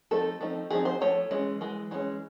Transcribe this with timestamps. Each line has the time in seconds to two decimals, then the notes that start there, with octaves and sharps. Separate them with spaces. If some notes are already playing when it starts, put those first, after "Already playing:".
0.11 F3 A3 C4 D#4 A4
0.41 F3 A3 C4 D#4
0.70 F3 A3 C4 D#4 G#4
0.85 C5
1.01 F3 A3 C#5
1.31 E3 G#3 C#4
1.61 E3 G#3
1.91 E3 G#3 C#4